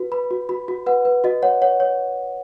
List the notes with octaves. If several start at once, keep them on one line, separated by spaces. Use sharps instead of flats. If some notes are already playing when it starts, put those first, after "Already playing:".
Already playing: F#4 B4
B4 B5
F#4
F#4 B5
F#4
B4 F#5
B4
F#4 D#5
C#5 F#5
C#5 F#5
C#5